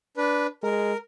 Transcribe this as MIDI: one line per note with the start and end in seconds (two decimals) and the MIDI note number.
0.17 0.47 62
0.17 0.47 71
0.63 0.93 56
0.63 0.97 70